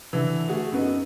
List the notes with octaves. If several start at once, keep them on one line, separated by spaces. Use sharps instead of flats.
D3 E3
A3 F#4 G#4
F#2 B3 D#4